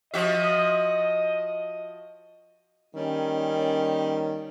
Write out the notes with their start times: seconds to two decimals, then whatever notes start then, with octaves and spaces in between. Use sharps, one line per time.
0.14 F3 F#4 D#5 E5
2.95 D#3 G3 A#3 C#4